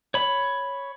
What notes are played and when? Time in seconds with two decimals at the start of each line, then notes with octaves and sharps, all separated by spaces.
0.14 C#5 B5